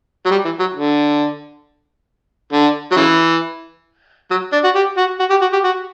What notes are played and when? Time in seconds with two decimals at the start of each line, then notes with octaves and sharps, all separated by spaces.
0.25 F#3
0.30 G3
0.45 E3
0.59 F#3
0.74 D3
2.53 D3
2.91 F#3
2.96 C#3 E3
4.30 F#3
4.52 D4
4.64 F#4
4.75 G4
4.97 F#4
5.20 F#4
5.30 G4
5.41 F#4
5.52 G4
5.64 F#4